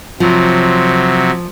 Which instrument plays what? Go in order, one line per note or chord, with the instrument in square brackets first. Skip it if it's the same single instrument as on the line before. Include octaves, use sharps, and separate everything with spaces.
[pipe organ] C3 F#3 [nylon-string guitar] F3